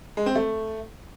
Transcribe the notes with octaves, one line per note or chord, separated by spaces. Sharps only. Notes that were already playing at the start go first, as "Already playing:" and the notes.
G#3
C4
A3